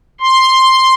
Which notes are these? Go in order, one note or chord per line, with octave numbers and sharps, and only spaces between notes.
C6